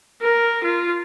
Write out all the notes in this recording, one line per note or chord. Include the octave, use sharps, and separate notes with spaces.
A#4
F4